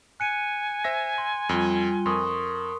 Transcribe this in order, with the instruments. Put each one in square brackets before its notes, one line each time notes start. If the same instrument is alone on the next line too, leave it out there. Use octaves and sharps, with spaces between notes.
[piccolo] G#5 [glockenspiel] F#6 C#7 D#7
[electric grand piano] C5 E5 A#6
[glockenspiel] C6
[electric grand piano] F2 [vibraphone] G3 F4 [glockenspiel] G7
[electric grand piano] F2 [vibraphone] A#4 [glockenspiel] C6 C#6 D#6